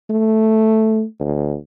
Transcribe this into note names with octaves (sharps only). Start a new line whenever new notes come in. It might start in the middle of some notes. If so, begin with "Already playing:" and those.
A3
D2